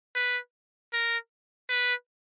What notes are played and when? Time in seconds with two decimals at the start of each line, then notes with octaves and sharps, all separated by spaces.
0.16 B4
0.93 A#4
1.70 B4